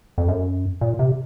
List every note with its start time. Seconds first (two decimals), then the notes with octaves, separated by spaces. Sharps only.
0.18 F2
0.28 F#2
0.81 A#2
0.99 C3